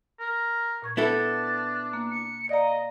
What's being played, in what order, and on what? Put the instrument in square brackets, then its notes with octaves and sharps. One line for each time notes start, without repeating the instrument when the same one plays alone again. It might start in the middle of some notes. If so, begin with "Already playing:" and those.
[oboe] A#4
[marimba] A#2 C#6 G#6
[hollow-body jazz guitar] B3 E4 A4 [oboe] D4 [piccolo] A6
[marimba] A#3
[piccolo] C#7
[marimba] D5 F5 A#5 [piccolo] D#5